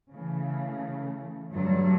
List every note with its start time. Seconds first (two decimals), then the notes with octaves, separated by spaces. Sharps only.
0.11 C#3 E3 A3
1.52 G2 D3 F#3 A3